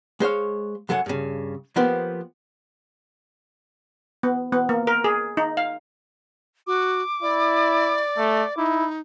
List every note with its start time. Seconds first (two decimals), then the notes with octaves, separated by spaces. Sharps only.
0.20 G#3 C5 C#5 F5
0.89 F#2 F#3 A4 F#5 G#5
1.06 G2 C#3
1.76 F3 A#3 B3 G4 C5
4.23 B3
4.52 B3
4.69 A#3
4.87 A#4
5.04 G#4
5.37 D#4
5.57 F5
6.67 F#4 D6
7.22 E4 D5
8.17 A3
8.57 D#4 E4